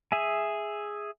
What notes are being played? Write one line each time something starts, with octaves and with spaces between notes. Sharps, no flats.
G#4 E5 G#5